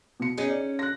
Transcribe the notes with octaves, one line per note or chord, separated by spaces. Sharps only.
B2 C#7
C#4 D#4 G#4
D5
F#6 A#6